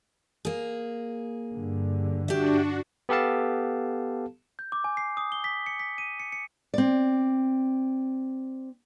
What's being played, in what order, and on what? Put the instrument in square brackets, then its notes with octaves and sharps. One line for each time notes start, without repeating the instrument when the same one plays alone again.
[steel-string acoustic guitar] A#3 G#4
[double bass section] G2 D3
[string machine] D4 F#4 [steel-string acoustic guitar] G4 E5
[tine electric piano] B3 G4 A4 F5 A5
[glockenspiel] G6
D6
G#5
C7
D#6
G7
B6
C#7
B6
D#7
C#7
C#7
[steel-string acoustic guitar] C4 D5